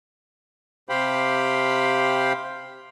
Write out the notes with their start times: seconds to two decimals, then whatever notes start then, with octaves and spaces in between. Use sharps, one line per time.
0.89 C3 G4 C5 F5 G5 B5